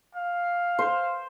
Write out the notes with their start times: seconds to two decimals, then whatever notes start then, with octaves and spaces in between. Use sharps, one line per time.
0.15 F5
0.79 C5